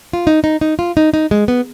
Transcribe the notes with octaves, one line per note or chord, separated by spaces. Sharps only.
F4
D#4
D#4
D#4
F4
D#4
D#4
G#3
B3